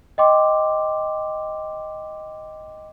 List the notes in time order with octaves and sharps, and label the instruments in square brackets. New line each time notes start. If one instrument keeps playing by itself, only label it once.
[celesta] D#5 G5 C6 D6